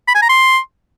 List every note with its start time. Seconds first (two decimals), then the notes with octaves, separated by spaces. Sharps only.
0.08 B5
0.15 G#5
0.22 A#5
0.29 C6